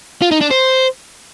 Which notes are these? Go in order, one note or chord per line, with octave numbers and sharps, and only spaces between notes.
F4
D#4
D4
C5